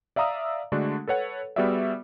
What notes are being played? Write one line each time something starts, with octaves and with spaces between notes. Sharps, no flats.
D5 E5 F5 A#5 D#6 E6
D3 G#3 A3 D4 F#4
A4 B4 C#5 F#5
G3 B3 F#4 G#4 D5 E5